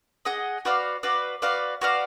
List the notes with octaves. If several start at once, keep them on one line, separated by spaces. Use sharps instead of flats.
G#4 D#5 F#5
F#4 B4 D5 F5
F#4 B4 D5 F5
F#4 B4 D5 F5
F#4 B4 D5 F5